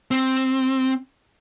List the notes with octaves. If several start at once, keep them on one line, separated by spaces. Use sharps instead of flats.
C4